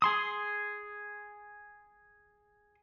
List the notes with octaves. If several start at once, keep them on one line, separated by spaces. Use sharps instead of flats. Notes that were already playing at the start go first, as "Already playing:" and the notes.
G#4 C6 D#6